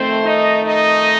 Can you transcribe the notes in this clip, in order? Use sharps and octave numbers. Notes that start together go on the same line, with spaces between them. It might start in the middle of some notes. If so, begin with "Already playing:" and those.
Already playing: F2 D#3 A3 C4 C5
D#4 D#5
D#4 D#5